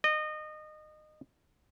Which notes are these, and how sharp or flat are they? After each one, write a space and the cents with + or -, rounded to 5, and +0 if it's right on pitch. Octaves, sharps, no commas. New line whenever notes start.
D#5 -25